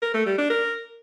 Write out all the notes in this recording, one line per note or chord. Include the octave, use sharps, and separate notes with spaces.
A#4
A3
G3
D4
A#4